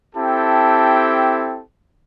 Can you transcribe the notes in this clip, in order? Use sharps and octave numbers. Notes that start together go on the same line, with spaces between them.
C4 E4 G4 A4 G5 A5